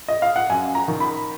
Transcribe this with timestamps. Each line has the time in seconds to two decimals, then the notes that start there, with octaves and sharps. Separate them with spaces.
0.08 D#5
0.22 F5
0.36 F#5
0.50 F#2 G#5
0.75 A#5
0.88 D#3
1.00 B5